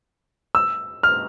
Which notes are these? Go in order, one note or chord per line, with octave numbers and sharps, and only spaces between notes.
E6
F6